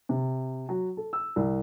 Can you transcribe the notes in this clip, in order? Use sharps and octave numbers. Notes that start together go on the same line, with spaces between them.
C3
F#3
A4
E6
C2